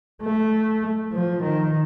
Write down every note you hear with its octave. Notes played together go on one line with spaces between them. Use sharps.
A3
F3
D#3